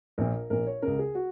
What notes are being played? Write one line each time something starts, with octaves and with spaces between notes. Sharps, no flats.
A#1 A#2 A#4
A#1 A#2 A#4
C#5
C#2 C#3 A#4
G#4
F#4